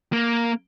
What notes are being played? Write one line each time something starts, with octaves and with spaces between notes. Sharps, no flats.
A#3